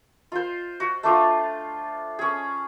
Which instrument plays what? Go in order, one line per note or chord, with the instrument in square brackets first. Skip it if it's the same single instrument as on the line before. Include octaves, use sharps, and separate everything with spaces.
[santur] F4 C5
F#4
A3 D4 F4
C#4 G#4